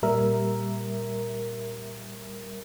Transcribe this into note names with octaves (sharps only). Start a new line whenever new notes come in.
A#2 G3 A#4 E5